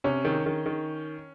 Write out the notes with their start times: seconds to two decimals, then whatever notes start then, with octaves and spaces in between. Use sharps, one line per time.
0.04 C3 C#4
0.25 D#3
0.46 D#3
0.66 D#3